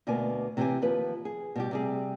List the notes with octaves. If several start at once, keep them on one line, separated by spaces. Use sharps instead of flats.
D2 B2 A#3 B4 D5 G#5
C3 E3 G#3 C4 G4 G#5
D#2 F3 B4
G#4
B2 G3 G4
C3 G3 G#4